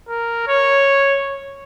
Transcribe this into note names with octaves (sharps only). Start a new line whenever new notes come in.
A#4
C#5